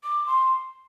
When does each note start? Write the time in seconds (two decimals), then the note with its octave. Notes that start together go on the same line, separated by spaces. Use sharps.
0.04 D6
0.27 C6